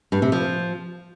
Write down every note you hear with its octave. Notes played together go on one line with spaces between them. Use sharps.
G2
C3
F3